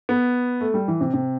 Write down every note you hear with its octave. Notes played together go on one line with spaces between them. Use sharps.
B3
A3
G3
E3
C3
C3